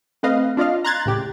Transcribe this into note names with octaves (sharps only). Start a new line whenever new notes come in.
A3 C4 B4 D#5 F5
D4 F4 D5 D#5 F5
A#5 C6 F#6 G#6 A6
A2 C#3 G4